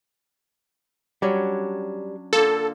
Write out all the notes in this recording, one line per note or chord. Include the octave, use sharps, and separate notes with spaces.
F#3 G3 C#4 D4
D3 A#3 F4 A4